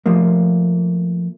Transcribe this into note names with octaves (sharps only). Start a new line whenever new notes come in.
F3 A3 A#3